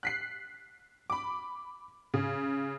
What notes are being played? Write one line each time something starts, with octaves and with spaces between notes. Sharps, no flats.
F#6 B6 C7
B5 D6
C#3